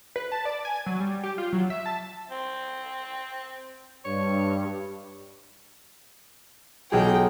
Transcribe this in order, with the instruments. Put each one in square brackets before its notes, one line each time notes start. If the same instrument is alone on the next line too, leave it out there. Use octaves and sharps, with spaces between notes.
[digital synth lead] B4
A5
D5
G#5
F#3
G3
G4
F4
F#3
E5
A5
[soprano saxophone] C4
[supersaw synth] G2 [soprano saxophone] C#5
[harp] B1 G#4 [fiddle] G5